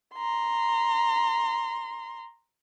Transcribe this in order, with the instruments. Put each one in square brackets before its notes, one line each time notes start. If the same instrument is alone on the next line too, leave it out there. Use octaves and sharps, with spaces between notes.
[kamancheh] A#5 C6